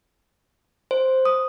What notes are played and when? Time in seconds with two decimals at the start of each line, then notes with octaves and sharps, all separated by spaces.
0.91 C5
1.25 D#6